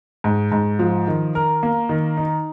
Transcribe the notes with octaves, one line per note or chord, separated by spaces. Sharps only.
G#2
G#2
F3
D#3
A#4
A#3
D#3
D#4